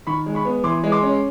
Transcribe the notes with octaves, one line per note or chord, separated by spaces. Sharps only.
D#3 B5 C#6
G#3
B5 C#6
B3
E3 C6 D6
G#3
C6 D6
C#4